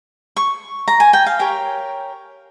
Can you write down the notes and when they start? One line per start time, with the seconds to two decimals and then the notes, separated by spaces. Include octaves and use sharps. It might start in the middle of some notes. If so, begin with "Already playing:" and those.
0.36 C#6
0.88 A#5
1.00 G#5
1.13 G5
1.26 F5
1.39 G4 A#4 C#5